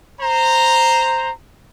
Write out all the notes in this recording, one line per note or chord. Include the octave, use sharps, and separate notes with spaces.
C5 A#5